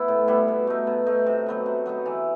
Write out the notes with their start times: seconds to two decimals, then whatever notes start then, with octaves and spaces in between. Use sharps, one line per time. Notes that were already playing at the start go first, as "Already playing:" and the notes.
Already playing: B3 E4
0.08 A2
0.28 G3 B3 E4
0.48 B2
0.67 A3 D#4
0.87 B2
1.06 A3 D#4
1.26 C3
1.46 F#3 B3 D#4
1.66 C3
1.86 F#3 B3 D#4
2.06 E3